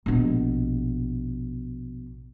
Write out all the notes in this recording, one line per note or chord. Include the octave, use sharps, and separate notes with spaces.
A#1 B2